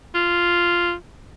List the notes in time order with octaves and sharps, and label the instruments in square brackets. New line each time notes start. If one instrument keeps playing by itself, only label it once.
[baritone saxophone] F4